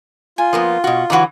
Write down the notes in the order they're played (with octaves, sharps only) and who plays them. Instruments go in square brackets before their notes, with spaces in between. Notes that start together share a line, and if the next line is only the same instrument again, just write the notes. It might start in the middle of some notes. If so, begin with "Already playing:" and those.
[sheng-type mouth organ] F4 [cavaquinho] G#5
[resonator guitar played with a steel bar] F3 A#3 B3
B2 F#4
[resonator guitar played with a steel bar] D3 E3 F#3 [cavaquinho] D#4 F#4